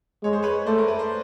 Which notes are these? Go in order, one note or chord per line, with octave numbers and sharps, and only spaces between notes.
G#3 C#5
C5
B4 C#5
A3 C5 D5
A#4
B4
C5